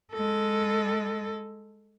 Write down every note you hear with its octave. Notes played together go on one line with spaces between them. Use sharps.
G#3 A4